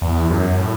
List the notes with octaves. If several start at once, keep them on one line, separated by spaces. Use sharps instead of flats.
E2
F#2
A2